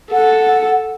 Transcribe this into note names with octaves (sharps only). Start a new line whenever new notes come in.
A4 F#5